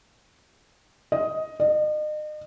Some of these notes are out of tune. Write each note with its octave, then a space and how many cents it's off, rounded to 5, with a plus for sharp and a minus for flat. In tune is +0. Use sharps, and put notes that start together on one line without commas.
D#5 +10
D#5 -40